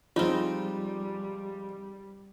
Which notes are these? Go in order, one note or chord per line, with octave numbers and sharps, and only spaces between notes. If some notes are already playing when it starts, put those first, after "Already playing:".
F3 G3 G#3 C4 D#4 F4